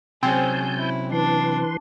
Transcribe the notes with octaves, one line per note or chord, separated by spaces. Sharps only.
C3 F#3 C4 C#4 G#4 G#5 A5 G6
E4
E3 D4 B4 C6